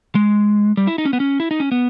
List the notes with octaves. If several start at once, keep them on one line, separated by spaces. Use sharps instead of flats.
G#3
G3
E4
D#4
C#4
B3
C#4
E4
D#4
C#4
B3